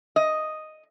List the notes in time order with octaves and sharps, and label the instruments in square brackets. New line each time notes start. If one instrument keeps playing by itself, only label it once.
[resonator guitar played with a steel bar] D#5